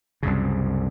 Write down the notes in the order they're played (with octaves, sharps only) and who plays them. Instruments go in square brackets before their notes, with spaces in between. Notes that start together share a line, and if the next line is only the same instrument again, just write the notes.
[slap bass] C2 F#2 C#3